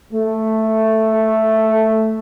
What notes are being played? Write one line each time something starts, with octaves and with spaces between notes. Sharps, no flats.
A3